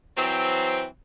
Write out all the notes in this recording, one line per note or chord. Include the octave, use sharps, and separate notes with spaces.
E3 F#3 C4